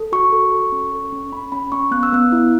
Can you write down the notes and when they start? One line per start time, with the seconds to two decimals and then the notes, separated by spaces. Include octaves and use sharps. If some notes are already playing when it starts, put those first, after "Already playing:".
Already playing: A4
0.12 F#4 C#6
0.32 A4
0.52 A4
0.72 C#4
0.92 A4
1.12 C#4
1.32 C#4 B5
1.52 C#4 B5
1.72 C#4 C#6
1.91 B3 F#6
2.03 E6
2.12 B3 F#6
2.32 E4